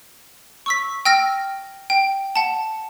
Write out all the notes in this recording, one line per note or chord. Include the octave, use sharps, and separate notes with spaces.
C#6 E6 B6
G5 E6 F6 A#6
G5
F#5 A5